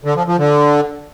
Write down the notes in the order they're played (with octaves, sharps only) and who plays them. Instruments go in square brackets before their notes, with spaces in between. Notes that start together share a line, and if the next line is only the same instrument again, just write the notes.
[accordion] D3
F3
F3
D3